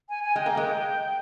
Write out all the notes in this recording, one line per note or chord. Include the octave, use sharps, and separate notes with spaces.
G#5
G#5
G#3 G5
A#3
G#3